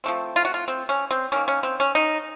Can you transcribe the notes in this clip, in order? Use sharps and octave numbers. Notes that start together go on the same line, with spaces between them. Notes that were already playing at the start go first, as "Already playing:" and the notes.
F3 A3 C4
F4
F#4
F4
C4
C#4
C4
D#3 A#3 C#4
C#4
C4
C#4
D#4